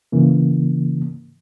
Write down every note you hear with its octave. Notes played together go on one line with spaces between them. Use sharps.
G#2 C#3 E3 A#3